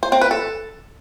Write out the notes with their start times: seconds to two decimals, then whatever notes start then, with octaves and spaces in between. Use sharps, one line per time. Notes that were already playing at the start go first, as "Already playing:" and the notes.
0.03 C5
0.12 C4
0.21 B4
0.31 A4